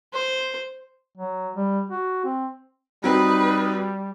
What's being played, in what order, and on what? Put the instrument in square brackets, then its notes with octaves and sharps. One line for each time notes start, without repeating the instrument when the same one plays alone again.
[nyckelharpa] C5
[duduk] F#3
G3
F#4
C4
[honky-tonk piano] F#3 C4 [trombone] G3 [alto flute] D#4 [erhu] B4